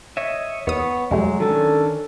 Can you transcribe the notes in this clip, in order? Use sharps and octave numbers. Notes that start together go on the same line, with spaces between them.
C#5 D#5 E5
E2 B3 C#5 D#6
F2 C3 F#3 G#3 A3
D#3 C#4 D4 A4